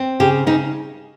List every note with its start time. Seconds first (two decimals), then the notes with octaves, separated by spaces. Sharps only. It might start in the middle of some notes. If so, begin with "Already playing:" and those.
Already playing: C4
0.20 C#3 G4
0.46 C#3 D#4